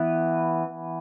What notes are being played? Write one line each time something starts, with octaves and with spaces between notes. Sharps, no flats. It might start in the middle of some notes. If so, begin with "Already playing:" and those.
Already playing: E3 B3